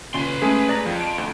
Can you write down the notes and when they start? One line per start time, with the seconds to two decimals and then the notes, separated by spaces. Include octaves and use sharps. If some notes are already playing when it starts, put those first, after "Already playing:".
0.14 A#2 C#3 B4 C6
0.42 G#3 A3 C#4 G#4
0.69 D5 A5 A#5
0.86 F2 F3
1.01 D7
1.18 D2